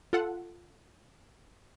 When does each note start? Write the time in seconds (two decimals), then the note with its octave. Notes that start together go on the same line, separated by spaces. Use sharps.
0.13 F4 A4 F#5